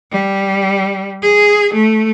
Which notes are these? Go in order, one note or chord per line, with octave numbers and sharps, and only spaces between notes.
G3
G#4
A3